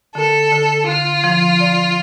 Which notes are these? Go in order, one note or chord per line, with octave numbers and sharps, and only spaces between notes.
D3 A4
D3
D3 F4
F3
D5